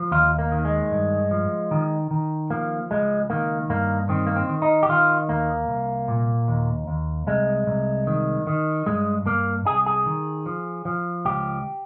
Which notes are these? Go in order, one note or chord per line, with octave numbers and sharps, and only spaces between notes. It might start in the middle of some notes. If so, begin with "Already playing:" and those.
Already playing: F3
D#2 F4
A#3
D#3
G#3
G2
F3
D#3
D#3
F3 A#3
C#2 G#3
D#3 A#3
G2 A#3
D#3 C4
A#3
C4
D#3
D#4
G4
D#3 F4
D#2 A#3
C2
A#2
D#2
D#2
C2 G#3
C2
D#3
D#3
G2 G#3
G2 A#3
C2 G#4
G#4
D#3
F3
F3
C#2 G4